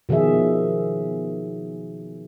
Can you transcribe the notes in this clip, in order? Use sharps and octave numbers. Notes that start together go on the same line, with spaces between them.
B2 D#3 F3 G#4 E5